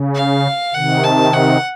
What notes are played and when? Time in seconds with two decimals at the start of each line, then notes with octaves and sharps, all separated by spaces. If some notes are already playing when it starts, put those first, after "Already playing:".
Already playing: C#3
0.15 F5
0.74 C3 D#3 F#5
1.04 A5
1.33 F#5